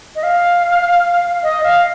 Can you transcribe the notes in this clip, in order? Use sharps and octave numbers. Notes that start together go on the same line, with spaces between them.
D#5
F5
D#5
F5